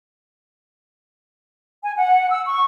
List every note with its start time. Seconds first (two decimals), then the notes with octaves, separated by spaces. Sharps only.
1.83 G#5
1.96 F#5
2.31 E6
2.46 C#6